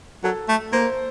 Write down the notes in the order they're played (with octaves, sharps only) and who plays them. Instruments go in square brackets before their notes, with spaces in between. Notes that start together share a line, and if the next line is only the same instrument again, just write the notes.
[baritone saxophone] F#3 [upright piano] A4
[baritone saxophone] A3
[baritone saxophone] A#3 [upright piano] C5